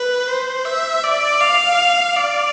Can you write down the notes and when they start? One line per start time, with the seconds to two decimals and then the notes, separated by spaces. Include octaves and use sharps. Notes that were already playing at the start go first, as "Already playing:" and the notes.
Already playing: B4
0.27 C5
0.65 E5
1.04 D5
1.41 F5
2.16 D5